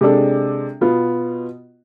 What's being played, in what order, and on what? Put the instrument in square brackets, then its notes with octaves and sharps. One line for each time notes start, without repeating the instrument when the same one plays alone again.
[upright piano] C3 G#3 D4 A4
B2 B3 F4